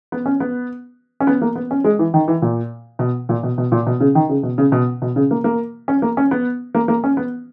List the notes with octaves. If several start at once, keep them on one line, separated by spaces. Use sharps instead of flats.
B3
C#4
B3
C#4
B3
A#3
B3
C#4
G#3
E3
D#3
E3
A#2
B2
A#2
B2
B2
A#2
B2
C#3
D#3
C#3
B2
C#3
B2
B2
C#3
A#3
A#3
C#4
A#3
C#4
B3
A#3
A#3
C#4
B3